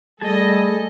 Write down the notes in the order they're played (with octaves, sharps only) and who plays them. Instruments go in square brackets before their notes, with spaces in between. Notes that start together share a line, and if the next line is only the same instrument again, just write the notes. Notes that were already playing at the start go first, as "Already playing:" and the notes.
[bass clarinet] G3 [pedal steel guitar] A3 G#4 A5 [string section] A4 D#5